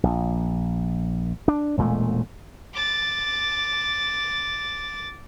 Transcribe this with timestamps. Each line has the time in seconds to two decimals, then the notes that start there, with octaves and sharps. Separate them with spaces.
0.03 A#1
1.48 D4
1.77 E1 A#2 G#3 A3
2.74 D6 A6